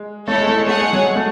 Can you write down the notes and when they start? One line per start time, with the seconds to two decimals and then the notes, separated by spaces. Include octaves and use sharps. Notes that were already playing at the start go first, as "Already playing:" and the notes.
Already playing: G#3
0.28 A3 E4 A4 C#5
0.38 G#3
0.47 A3
0.58 G#3
0.67 A3 G#4 C#5 F#5
0.80 G#3
0.93 F#3
1.06 G#3
1.15 A3